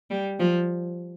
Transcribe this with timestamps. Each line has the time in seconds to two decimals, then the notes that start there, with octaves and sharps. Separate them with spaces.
0.10 G3
0.39 F3